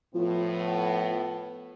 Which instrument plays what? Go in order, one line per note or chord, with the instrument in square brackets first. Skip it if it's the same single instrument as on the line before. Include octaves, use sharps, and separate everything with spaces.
[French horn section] A2 B3 [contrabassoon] F3